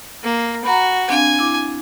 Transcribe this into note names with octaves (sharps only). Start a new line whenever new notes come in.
A#3
F#4 A#5 B5
C4 D4 F5 G#5
E4 D6